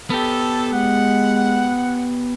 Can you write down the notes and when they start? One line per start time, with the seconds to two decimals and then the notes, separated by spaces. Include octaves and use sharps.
0.10 B3 G4 A4
0.73 G#3 F#5